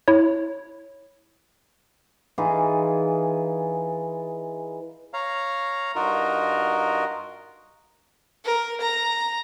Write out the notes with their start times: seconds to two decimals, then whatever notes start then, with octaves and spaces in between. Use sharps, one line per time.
0.08 E4 C#5
2.38 E3 D#4 F4 G#4
5.14 C#5 F5 A#5
5.95 G2 D#4 F4 F#4 A#4
8.44 A#4
8.81 A#5